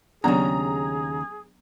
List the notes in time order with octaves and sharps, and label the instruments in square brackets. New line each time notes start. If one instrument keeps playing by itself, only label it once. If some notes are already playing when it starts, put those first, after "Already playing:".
[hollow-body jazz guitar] D#2 C#3 [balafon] F#3 B3 D4 [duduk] G#4 [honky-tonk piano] A#5